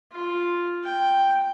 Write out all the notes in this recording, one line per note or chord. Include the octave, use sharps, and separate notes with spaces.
F4
G5